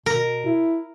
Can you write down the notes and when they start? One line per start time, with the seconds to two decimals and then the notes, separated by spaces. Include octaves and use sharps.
0.06 B2 A#4
0.45 E4